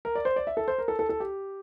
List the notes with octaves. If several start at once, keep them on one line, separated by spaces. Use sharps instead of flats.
A#4
D5
C5
D5
E5
A4
C5
A#4
A4
A4
A4
G4